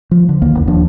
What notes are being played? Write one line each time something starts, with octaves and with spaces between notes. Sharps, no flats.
F3
D3
D2 D#3 A#3
F#1 E2
D1 D#2 F3 D4